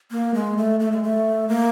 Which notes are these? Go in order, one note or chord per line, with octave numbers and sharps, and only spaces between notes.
A#3
G#3
A3
A3
G#3
A3
A#3